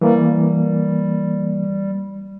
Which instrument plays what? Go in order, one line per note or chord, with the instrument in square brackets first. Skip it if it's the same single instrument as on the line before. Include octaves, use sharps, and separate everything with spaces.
[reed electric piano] E3 A#3 [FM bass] G3